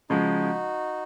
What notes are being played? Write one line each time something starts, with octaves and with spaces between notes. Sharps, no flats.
C#3 F3 G#3 D#4 F#4